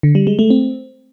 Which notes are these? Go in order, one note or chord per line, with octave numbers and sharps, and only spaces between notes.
D3
G3
G#3
A3
C4